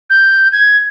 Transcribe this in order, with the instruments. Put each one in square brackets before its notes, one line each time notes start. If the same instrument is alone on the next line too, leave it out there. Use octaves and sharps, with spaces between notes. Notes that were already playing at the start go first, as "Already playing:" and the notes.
[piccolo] G6
G#6